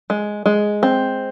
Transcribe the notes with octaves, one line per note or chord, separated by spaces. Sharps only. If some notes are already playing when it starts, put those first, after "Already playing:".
G#3
G#3
C4